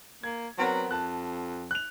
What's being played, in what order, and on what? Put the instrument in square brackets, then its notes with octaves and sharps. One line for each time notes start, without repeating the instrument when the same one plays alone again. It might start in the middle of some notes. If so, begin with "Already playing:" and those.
[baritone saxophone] A#3 [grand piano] G#6
[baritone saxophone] F#3 [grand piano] B3 C4 A#4
[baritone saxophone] F2 [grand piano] A5 F#6
[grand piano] F#6 F7